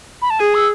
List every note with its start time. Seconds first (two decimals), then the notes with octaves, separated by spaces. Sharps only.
0.22 B5
0.30 A5
0.40 G#4 G#5
0.55 E6